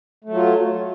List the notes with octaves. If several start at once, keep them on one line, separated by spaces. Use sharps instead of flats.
F#3 A3 F4